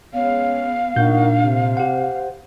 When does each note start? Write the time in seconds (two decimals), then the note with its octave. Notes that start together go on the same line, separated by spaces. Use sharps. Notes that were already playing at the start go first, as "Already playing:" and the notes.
0.14 G#3 B3 C#4 C#5 F5
0.96 A#2 D4 D#4 F#4 A#4 G6
1.43 C3
1.77 G4 C5 F#5